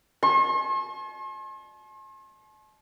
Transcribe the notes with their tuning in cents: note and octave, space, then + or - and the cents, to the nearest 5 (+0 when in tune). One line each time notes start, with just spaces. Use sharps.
A5 -45 C6 +45